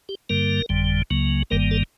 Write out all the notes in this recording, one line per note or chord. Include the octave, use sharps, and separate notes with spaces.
G4
G2 D3 G3 A#3 A#4
G1 F2 D3 G3
C#2 C#3 F#3 A#3
G1 G2 D#3 G3 A#3 A#4
A4